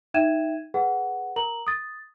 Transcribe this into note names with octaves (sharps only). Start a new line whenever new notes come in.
D#4 E5 G5 G#6 D#7 E7
G#4 B4 F#5
A#4 A#5 F#7
D#6 A6